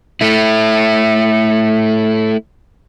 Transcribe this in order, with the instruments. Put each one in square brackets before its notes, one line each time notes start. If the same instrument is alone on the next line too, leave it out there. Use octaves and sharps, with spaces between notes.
[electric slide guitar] A3 E4